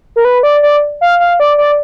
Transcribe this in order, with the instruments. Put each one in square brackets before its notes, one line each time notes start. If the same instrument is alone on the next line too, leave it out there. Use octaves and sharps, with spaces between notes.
[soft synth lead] A#4
B4
D5
D5
F5
F5
D5
D5